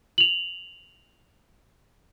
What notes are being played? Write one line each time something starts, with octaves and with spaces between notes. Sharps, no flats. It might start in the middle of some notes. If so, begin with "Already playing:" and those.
F7 F#7